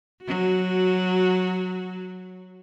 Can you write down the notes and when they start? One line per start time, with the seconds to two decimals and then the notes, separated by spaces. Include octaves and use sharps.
0.23 F#3 F#4